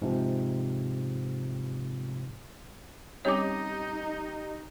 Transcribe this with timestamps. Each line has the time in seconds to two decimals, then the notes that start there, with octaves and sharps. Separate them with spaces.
0.02 G#2 C3 F3
3.25 G3 C4 C#4 D#4 G4 C#5 D#5 D6